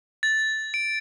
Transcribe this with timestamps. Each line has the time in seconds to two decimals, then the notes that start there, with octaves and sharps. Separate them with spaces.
0.23 A6
0.74 D7